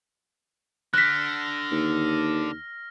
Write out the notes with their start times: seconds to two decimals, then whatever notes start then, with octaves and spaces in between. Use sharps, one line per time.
0.94 D3 F6 F#6 A#6 B6
1.71 D#2